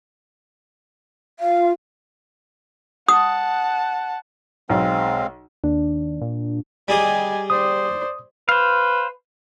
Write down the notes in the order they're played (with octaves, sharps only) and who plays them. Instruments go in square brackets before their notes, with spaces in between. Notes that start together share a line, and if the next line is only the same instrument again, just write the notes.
[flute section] F4 [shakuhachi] F5
[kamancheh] F#5 A5 [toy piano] D#6
[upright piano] B1 [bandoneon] G#3 C4 F5
[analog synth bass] D#2 [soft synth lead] D4
[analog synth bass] A#2
[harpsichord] G3 G#4 [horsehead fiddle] D#5 G#5
[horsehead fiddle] C5 D5 [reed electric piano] D#6
[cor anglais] B4 [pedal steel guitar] C5 F5